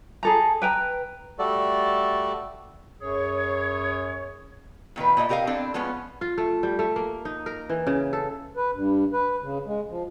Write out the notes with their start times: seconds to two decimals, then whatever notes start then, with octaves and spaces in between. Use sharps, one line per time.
0.23 G#4 A4 A#5
0.62 B4 G5 A#5
1.39 G3 A3 F#4 A4 D5
3.01 F#2 G#4 C#5
4.96 A#2 D#3 D#4 B4
5.17 A#2 A#3 D#5 E5
5.29 C3 G4 A#4 D#5 F5
5.47 C4 D4 E4 A4
5.74 F3 G#3 B3 C#4
6.21 F4
6.38 A3
6.63 G3
6.79 A3
6.96 A#3
7.25 D#4
7.46 A#4
7.69 E3
7.87 C#3
8.13 A4
8.56 B4
8.73 G2
9.12 B4
9.42 C#3
9.66 G#3
9.89 F3